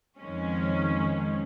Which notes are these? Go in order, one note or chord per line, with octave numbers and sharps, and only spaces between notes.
F2 D#3 G#3 C#4